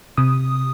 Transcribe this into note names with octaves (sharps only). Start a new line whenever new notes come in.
C3 D#6